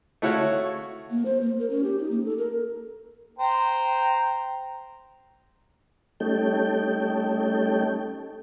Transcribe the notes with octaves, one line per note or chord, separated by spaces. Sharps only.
A3 E4 F#4 C#5 F5
A#3
C5
A#3
A#4
C#4
G4
D#4
A#3
A4
A#4
C5 G5 A#5
G3 A3 C#4 D#4 A4 G5